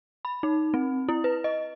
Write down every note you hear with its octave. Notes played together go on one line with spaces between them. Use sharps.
B5
D#4
C4
E4
B4
D#5